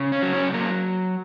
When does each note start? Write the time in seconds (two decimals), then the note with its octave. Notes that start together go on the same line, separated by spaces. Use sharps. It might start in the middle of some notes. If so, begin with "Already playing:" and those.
Already playing: C#3
0.12 C#4
0.22 F#3
0.33 C#4
0.54 F#3 A#3